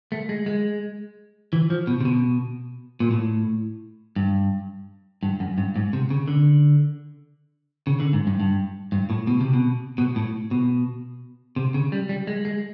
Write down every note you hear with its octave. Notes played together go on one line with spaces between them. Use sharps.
A3
G#3
G#3
E3
F3
B2
C3
B2
A#2
A2
G2
G2
F#2
G2
G#2
C3
C#3
D3
C#3
D3
G#2
G2
G2
G2
A2
B2
C3
B2
B2
A2
B2
C3
C#3
G3
G3
G#3
G#3